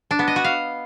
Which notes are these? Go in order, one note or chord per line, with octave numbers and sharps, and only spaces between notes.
D4
B3
D#5
F#4
F5